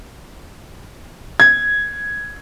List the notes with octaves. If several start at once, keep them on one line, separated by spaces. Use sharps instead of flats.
G#6